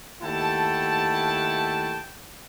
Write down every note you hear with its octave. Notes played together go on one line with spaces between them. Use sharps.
D#2 A3 E4 F#5 G5 A5